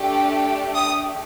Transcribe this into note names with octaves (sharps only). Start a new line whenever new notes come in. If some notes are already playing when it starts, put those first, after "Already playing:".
Already playing: A3 D4 G4
D#6